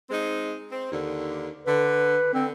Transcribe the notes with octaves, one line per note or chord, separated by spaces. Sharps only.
G#3 C4 D#4
C4
D#2 D3
D3 B4
D3 C4